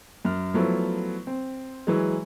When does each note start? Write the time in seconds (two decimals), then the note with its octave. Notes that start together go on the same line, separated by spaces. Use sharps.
0.25 F#2 F6
0.54 F3 F#3 A3 B3 E4
1.27 C4
1.87 E3 F#3 G#3